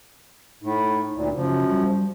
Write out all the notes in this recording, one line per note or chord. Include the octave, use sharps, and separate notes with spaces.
A2 D#4
D2 A#2
F#2 C#3 F3
G3